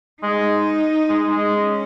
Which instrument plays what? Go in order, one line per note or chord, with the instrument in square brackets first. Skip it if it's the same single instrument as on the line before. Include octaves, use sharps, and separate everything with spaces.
[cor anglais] G#3 [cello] D#4
[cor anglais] G#3
G#3
[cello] C#4